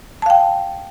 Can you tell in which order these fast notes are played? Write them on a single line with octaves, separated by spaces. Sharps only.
A5 F5 G5